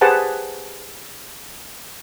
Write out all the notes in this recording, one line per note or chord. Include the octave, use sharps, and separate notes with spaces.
G4 G#4 B4 C5 F#5 A5